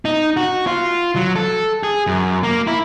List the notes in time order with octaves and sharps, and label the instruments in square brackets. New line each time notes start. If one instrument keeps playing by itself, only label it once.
[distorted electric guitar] D#4
F#4
F4
F#3
A4
G#4
F#2
A#3
E4